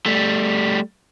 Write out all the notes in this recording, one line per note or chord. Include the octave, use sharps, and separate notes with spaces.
G3 A3